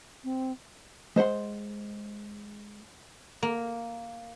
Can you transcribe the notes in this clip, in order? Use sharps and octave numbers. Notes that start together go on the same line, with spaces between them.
C4
G#3 C5 F#5 C6
A#3